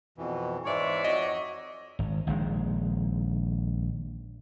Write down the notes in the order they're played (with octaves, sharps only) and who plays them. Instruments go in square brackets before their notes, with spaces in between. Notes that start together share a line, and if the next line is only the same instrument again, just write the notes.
[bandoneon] F2 B2 E3
[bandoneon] G#2 E3 G#3 [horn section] C#5 D5 E5
[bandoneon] F2 F#4 [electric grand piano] D#5
[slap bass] G#1
A#1 D#3 G#3